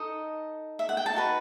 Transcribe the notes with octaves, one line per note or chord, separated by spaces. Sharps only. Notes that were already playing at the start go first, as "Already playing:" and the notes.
Already playing: D#4 A4 D#5
E5
F#5
G5
A5
D#4 F#4 B4